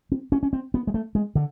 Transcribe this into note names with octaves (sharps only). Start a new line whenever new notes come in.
C4
C#4
C#4
C4
B3
G#3
A3
G#3
D3